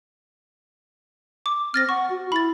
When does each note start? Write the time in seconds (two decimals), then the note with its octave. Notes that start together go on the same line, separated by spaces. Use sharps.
1.46 D6
1.74 C4 F6 A6 A#6
1.89 F#5 C#6
2.10 F#4
2.32 E4 B5 A6